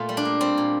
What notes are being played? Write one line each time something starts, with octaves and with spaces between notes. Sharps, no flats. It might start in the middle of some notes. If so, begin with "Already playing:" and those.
Already playing: A#2 A3 F4
G3
D4
A#3
G3 C4
A#2